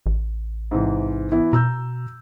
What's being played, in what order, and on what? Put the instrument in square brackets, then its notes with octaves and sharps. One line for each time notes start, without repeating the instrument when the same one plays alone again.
[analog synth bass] A1
[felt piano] G#2 C3 E3
E3 B3 E4
[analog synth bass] B2 [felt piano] A#5 E6 G6